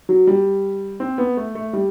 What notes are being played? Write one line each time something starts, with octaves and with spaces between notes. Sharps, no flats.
F#3
G3
C4
B3
A3
A3
G3